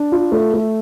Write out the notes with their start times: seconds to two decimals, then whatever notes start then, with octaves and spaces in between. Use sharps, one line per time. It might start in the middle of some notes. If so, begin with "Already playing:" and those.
Already playing: D4
0.12 F4
0.32 A3
0.54 A3